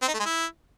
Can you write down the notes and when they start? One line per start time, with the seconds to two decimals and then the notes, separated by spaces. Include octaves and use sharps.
0.02 C4
0.08 D#4
0.14 A3
0.20 G#3
0.26 E4